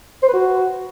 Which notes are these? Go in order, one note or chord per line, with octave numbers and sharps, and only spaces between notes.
C5
B4
F#4